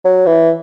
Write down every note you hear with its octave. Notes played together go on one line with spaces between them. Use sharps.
F#3
E3